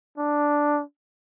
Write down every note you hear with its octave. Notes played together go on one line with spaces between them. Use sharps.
D4